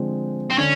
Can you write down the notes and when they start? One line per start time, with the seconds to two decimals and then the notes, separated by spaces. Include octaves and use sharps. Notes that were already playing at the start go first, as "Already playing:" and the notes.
Already playing: D3 F3 G#3 C4
0.50 C4
0.58 D3 C#4